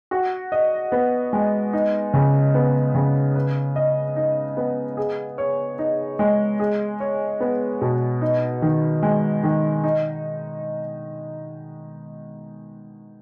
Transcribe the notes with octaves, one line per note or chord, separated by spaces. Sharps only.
F#4
D#5
B3
G#3
D#4
C#3
B3
C#3
B4
D#5
D#4
B3
G#4
C#5
D#4
G#3
G#4
C#5
B3
B2
D#4
D#3
G#3
D#3
D#4